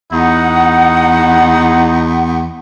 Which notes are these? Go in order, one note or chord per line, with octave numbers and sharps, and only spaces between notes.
E2 D#4 F#5